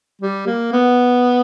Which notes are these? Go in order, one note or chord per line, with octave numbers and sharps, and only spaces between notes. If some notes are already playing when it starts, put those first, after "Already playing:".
G3
A#3
B3